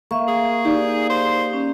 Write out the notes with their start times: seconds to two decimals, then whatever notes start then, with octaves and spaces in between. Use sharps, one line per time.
0.11 A#3 E5 C#6
0.28 G#4
0.65 D#4 G4 D5
1.10 C5
1.53 C#4